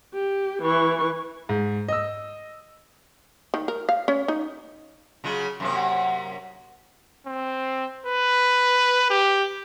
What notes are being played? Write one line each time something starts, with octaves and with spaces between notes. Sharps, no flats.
G4
E3 C#6
G#2
D#5 E6
D#3
A#4
F5
C#4
D#4
C#3 F#3 F4
F#2 C3 A#3
F#5
C4
B4
G4